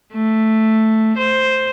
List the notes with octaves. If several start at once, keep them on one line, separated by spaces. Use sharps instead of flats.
A3
C5